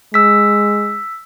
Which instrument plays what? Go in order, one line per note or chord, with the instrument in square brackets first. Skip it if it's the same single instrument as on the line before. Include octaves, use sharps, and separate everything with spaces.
[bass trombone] G#3 [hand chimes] E6 B6